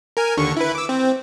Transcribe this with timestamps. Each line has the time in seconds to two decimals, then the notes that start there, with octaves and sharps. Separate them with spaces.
0.17 A#4 G#5
0.37 D#2 D3 C#6
0.57 E4 B4
0.75 D6 E6
0.89 C4